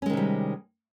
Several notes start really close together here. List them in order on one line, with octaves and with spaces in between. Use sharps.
C#4 G#3 D#3 C3 G3